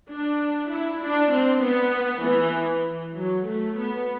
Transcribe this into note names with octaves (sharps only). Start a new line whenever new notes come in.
D4
E4
D4
C4
B3
E3
F#3
A3
B3